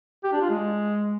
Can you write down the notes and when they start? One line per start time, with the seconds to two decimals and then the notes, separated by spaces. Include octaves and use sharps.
0.24 G4
0.33 D4
0.41 F4
0.50 G#3